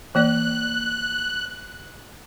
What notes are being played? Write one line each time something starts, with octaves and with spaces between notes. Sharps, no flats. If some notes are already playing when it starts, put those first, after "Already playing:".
E3 A#3 D5 F#6